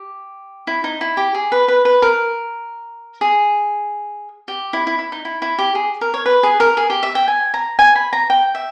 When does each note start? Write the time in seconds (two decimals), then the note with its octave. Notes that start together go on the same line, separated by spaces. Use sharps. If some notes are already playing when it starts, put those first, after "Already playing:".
Already playing: G4
0.67 E4
0.84 D#4
1.01 E4
1.17 G4
1.35 G#4
1.52 B4
1.68 B4
1.85 B4
2.02 A#4
3.21 G#4
4.48 G4
4.73 E4
4.87 E4
4.99 E4
5.12 D#4
5.25 E4
5.42 E4
5.59 G4
5.75 G#4
6.01 A#4
6.14 C#5
6.26 B4
6.43 G#4
6.60 A#4
6.77 G#4
6.90 G4
7.03 E5
7.15 G5
7.28 G#5
7.54 A#5
7.79 G#5
7.95 B5
8.13 A#5
8.30 G5
8.55 E5